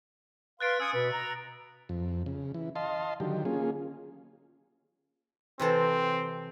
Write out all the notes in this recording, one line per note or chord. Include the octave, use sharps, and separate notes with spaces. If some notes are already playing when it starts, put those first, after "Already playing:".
B4 F5 C6 F#6 A6 D7
C#4 G#5 D#6 E6 C#7
B2 B4
A#5
F2
C#3
E3
D#5 F5 A5 C6
D3 D#3 F#3 G4
A#3 C#4 F4 G#4
C3 E3 C4 A4